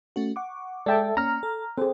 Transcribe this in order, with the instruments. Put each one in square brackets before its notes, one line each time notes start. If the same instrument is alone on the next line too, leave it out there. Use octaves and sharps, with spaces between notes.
[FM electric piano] A3 C#4 F#4
F#5 C#6 D6
[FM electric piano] G#3 [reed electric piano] A4 E5 A5 [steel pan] D5 G5
[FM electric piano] A#3 C#4 [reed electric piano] A#5 F6
[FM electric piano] A4
[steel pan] C4 G#4 [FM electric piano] A4